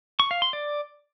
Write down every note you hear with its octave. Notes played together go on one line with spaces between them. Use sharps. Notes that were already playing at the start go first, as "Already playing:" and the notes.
C#6
F5
C6
D5